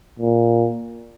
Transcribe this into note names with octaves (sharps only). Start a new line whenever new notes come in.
A#2